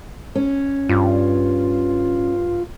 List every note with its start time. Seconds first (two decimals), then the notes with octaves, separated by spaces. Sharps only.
0.35 C#4
0.89 G2 F4